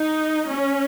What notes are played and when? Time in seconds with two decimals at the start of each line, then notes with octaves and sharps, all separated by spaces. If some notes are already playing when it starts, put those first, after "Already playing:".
Already playing: D#4
0.50 C#4